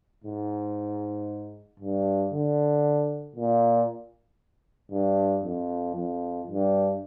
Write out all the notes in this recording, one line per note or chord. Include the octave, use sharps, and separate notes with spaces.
G#2
G2
D3
A#2
G2
F2
F2
G2